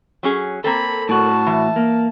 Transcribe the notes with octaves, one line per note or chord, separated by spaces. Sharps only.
F#3 C#4 G#4
A#3 C4 A4 B5
A2 F#4 A5
E3
A#3